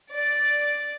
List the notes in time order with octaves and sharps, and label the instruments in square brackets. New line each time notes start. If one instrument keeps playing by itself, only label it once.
[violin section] D5